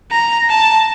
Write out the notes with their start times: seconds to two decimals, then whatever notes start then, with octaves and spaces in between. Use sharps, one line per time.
0.11 A#5
0.50 A5